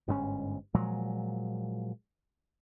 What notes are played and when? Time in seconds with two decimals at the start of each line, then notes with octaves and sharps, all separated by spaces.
0.08 G1 G#2 C4 C#4
0.74 A#2 F3 F#3 G#3